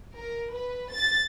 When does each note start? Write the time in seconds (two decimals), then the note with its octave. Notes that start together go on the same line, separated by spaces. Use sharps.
0.18 A#4
0.54 B4
0.93 A6